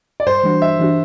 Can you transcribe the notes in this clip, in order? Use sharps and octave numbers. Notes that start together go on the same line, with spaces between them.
D5
G2 C5
E3 G3 D4 F#4
G2 E5
E3 G3 D4 F#4